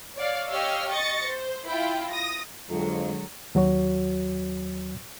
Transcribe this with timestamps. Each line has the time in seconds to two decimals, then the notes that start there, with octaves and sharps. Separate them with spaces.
0.16 C#5 D5 F5
0.49 G4 C#5 D#5 F5 E6 F6
0.91 D#5 C#6 A6 A#6 C#7
1.27 C5
1.68 E4 F4 G5
2.12 D#6 A#6
2.69 F2 D3 F#3 G#3
3.55 D#2 F#3 F#4 C#5